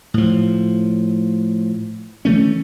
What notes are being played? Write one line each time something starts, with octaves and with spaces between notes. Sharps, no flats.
A2 F3
E3 F3 A3 C#4